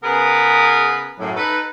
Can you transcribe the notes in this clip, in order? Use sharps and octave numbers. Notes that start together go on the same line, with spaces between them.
C#3 B3 G#4 A#4 B4
F#2 A2
D#4 A4 B4